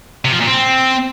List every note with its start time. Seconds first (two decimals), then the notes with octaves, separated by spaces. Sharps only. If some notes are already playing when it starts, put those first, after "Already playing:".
0.25 C3
0.32 F3
0.40 A#2
0.47 C4